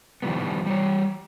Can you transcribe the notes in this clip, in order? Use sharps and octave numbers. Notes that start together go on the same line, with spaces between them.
D#3 F3 G3 B3
G3 C#5